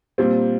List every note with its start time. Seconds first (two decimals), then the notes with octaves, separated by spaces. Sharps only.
0.18 A#2 G3 C4